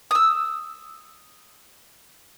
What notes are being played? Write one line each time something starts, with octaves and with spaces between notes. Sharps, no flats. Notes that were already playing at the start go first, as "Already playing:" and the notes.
D#6 E6